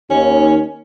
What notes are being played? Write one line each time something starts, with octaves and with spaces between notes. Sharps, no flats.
D#2 C#4